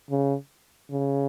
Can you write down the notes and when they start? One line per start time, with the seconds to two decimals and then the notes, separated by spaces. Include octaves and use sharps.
0.11 C#3
0.91 C#3